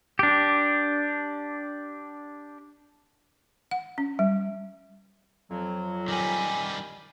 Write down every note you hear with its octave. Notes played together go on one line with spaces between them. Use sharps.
D4 G4
F#5
C#4
G3
F2 F#3
D#3 G3 G#5 D6